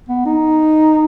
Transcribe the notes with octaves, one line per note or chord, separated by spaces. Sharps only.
B3
D#4